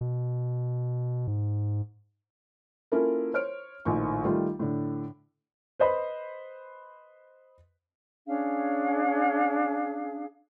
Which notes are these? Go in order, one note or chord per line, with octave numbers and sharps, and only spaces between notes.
B2
G#2
A#3 C#4 E4 F4 A4 A#4
C5 C#5 F6 D7
A#1 A2 D#3 F3 C#6
D#3 G3 A3 F4
A2 D3
B4 C5 D#5 B5
C#4 D4 G#4 F5